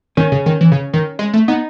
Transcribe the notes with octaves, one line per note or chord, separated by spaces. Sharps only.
D#3 C#4
C#3
D#3
E3
C#3
D#3
G#3
A3
B3 D#4